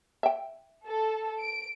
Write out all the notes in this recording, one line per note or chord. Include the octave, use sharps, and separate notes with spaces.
E5 G5
A4
D7